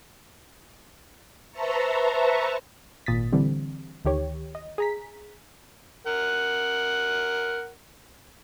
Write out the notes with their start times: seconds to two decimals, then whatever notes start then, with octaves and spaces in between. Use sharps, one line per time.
1.51 B4 C5 E5 A5 A#5 C#6
3.06 G#1 A#2 D#6 A6 B6
3.32 D3 E3 G3 C4
4.05 D2 D#3 G4 C#5
4.55 D#5
4.78 G#4 A#5 B6
6.07 A#4 F#5